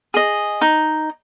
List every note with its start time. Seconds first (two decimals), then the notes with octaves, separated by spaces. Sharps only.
0.14 G#4 D#5
0.61 D#4